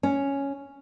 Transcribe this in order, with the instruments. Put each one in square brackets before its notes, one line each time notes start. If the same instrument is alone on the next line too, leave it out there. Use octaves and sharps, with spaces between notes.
[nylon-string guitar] C#4